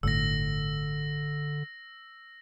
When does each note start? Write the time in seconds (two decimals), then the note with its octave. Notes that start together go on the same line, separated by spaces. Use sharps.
0.03 G1 A2 D3 E6 A#6